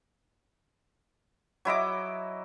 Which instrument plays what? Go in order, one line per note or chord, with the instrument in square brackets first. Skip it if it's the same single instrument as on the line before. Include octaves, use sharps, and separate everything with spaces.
[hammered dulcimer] F#3 E4 D#5 D6